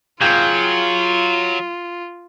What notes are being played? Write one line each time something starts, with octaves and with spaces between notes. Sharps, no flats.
F#3 F4 G#4 F5 G5